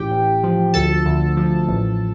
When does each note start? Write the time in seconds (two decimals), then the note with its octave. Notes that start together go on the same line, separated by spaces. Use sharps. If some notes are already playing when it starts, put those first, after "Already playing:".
Already playing: A1 G4 G5
0.11 A1
0.44 F3
0.74 D2 A4 A5
1.06 D2
1.37 F3
1.68 A1